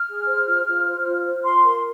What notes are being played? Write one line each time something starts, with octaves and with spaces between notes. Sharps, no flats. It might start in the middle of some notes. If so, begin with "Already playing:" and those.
Already playing: F6
G#4
C5
F4
F4
C5
F4
C5
F4 C6
A#4